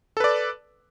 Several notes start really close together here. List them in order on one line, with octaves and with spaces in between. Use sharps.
A4 B4 D5